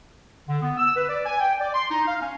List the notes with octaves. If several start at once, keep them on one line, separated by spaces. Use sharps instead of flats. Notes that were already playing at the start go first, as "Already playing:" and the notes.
D3
B3
E6
B4
D5
G#5
G5
D5
C6
D#4
F5
C#4